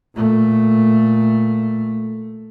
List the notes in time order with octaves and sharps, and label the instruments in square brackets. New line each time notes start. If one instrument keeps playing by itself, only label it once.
[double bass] A#2 A3